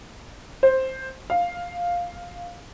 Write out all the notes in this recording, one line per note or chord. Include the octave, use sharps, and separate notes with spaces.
C5
F5